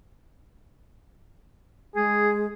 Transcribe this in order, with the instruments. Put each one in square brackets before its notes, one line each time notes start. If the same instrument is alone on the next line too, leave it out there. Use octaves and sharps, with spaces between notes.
[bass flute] G#3 [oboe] G#4